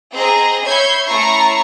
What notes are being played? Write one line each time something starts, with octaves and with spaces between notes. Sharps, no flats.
C4 G#4 C5 D#5 A#5
C#5 E5 B5 G6 G#6 C7
A3 C#4 E4 A#5 C#6 C7